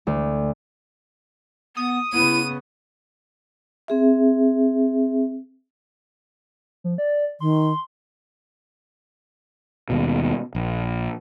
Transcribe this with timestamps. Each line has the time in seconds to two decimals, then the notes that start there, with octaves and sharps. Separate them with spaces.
0.07 D2
1.77 B3 D#6
2.13 C#3 B3 E4 D#7
3.88 C4 G#4 E5
6.84 F3
6.98 D5
7.40 D#3 C6
9.90 D#2 B2
10.55 A#1